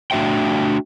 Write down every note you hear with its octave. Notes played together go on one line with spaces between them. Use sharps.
A3 D4 F#4 E5 G5